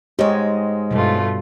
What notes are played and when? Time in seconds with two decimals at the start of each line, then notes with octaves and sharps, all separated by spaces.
0.19 G#2 G#3 G4 C#5 D#5
0.91 G2 B2 G3 A3 F4